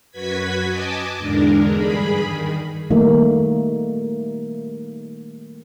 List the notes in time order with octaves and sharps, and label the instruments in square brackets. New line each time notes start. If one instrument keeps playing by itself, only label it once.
[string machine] F#2 F#4 B4 G#6 B6
D#5 G#5 A5 D6
E2 G#2 D3 G#3 D4 A#4
G2 G#4 B5
D#3
[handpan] D#3 G3 A3 A#3 D#4